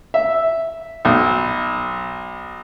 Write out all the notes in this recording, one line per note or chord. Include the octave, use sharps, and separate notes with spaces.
E5
B1